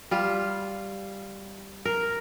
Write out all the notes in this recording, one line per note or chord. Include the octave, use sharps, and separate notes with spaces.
G3 F4
A#4